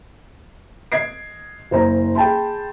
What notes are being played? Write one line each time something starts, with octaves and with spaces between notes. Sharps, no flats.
D#5 G#6 C7 D7
F#1 A#4 C5 A#5
G#4 G5 A5 B5 C6